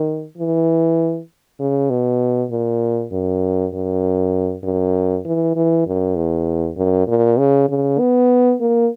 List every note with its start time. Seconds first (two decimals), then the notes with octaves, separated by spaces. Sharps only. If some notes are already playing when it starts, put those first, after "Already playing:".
Already playing: D#3
0.38 E3
1.59 C#3
1.90 B2
2.51 A#2
3.12 F#2
3.73 F#2
4.63 F#2
5.25 E3
5.56 E3
5.86 F#2
6.16 E2
6.76 F#2
7.07 A#2
7.38 C#3
7.69 C#3
7.99 B3
8.60 A#3